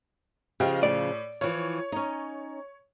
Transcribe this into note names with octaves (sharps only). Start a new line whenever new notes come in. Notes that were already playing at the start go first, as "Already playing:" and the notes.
C#3 F3 G4 D#5 F5
A2 D5
E3 F3 C#5
C#4 D#4